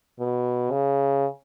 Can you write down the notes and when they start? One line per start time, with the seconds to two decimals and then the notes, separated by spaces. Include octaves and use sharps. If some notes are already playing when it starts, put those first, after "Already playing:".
0.19 B2
0.71 C#3